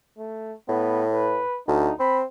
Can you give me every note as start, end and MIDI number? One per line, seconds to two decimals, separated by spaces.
0.18 0.54 57
0.69 1.41 45
0.69 1.05 59
1.12 1.61 71
1.68 1.91 38
1.68 1.94 63
1.99 2.24 60
1.99 2.19 83